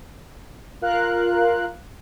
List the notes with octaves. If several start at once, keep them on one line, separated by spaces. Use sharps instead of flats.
F4 A#4 F5 F#6